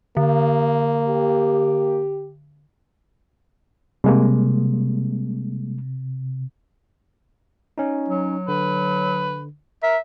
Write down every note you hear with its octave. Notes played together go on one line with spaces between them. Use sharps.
D3 A#3
G4
C3 G3 G#3 A#3
C#4 D#4
F#3
D3 B4
A#4 E5